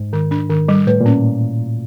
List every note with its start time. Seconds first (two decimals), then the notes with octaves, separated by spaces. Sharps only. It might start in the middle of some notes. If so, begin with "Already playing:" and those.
Already playing: G#2
0.13 D#3
0.31 D4
0.50 D#3
0.69 G3
0.87 A2 B4
1.00 A#2
1.06 C#4